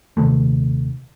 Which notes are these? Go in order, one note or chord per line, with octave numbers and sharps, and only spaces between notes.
D#1 C3 D#3 A3